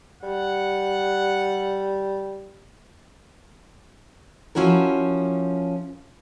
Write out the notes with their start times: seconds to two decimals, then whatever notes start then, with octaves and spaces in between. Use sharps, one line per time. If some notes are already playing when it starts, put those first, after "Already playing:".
0.23 G3 F#5
4.55 F3 C#4 E4 F#4 A#4